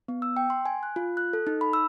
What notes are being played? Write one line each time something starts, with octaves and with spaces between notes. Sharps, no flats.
B3
E6
G5
C6
G#5
F#6
F4
F#6
A4
D#4
B5
E6